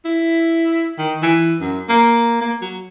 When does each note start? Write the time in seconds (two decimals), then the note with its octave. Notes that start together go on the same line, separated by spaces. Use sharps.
0.05 E4
0.98 D#3
1.22 E3
1.60 F#2
1.89 A#3
2.41 A#3
2.61 F#3